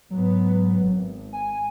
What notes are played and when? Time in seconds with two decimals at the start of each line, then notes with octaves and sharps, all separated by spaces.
0.10 G#2 F#3 B3
0.82 G#1
1.33 G#5